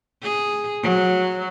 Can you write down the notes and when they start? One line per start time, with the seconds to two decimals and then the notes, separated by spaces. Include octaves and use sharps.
0.23 G#4
0.83 F#3